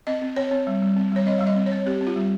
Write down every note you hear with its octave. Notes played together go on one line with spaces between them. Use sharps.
C4 D#5
C4
C4 C#5
C4
G3
G3
C4
G3 C#5
C4 D#5
G3 F5
D#5
C4
C#5
C4
C4 G4
C4
F4
G3